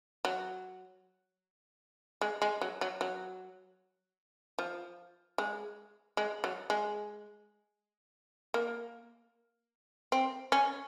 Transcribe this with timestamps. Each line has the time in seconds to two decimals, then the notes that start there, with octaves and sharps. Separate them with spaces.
0.25 F#3
2.21 G#3
2.42 G#3
2.61 F#3
2.81 F#3
3.01 F#3
4.59 F3
5.38 G#3
6.17 G#3
6.44 F#3
6.70 G#3
8.54 A#3
10.12 C4
10.52 C#4